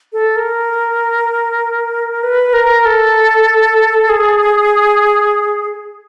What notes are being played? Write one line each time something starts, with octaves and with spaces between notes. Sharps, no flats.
A4
A#4
B4
A#4
A4
G#4